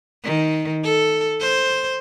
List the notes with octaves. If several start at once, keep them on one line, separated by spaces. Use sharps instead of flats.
D#3
A4
C5